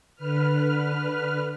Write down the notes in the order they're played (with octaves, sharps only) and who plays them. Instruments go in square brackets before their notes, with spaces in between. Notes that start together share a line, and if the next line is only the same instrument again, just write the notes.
[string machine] D3 B4 F6